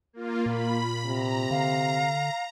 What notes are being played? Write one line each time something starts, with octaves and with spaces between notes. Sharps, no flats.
A#3 F4
A#2 A#3 B5
C3 A#5
D3 F5